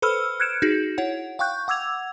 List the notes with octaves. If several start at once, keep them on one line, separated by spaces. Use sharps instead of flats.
A4 B4 C5 B5 E6 F6
F6 F#6 G#6 C#7 D7 E7
D#4 F#4 G#4
E4 C#5 F#5
F5 G5 C#6 F#6 G6
F#5 D6 E6 G#6 F7